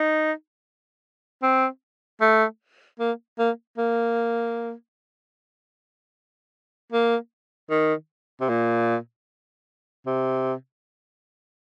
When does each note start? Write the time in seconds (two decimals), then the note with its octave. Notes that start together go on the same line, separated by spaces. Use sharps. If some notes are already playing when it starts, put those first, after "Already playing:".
Already playing: D#4
1.42 C4
2.21 A3
3.00 A#3
3.39 A#3
3.78 A#3
6.92 A#3
7.70 D#3
8.41 C3
8.49 A#2
10.06 C3